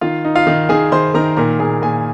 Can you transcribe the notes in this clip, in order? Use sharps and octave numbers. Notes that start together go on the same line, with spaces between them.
D#3 F4 F5
D#4
F4 F5
D#3
D#3 G#4 G#5
D#3 C5 C6
D#3 A#4 A#5
A#2 A#4 A#5
A#2 G#4 G#5
A#2 G#4 G#5